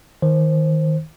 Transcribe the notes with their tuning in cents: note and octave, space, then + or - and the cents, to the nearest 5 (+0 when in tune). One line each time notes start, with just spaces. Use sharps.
D#3 +15 C5 +15